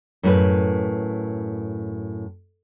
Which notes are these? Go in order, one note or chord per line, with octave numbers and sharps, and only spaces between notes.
F#2 A2 B4